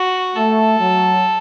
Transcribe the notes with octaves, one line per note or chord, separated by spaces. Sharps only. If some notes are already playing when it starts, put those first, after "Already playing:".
Already playing: F#4
A3 A4
F#3